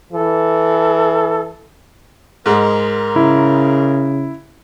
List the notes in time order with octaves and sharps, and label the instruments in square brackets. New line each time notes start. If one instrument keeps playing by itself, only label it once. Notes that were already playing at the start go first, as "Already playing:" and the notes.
[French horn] E3 [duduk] A4
[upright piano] G#2 G#3 [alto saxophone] A#4
[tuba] C#3 [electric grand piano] E4